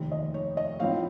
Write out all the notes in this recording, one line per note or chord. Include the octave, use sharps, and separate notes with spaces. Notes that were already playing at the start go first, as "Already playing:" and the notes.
Already playing: F1 D#2 D#3
D#5
C#5
D#5
A2 F3 C4 D#4 C#5 F5